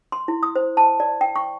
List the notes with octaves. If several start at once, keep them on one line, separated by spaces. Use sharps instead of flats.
C6
E4
D#6
C5
A5
D5
G5
C#6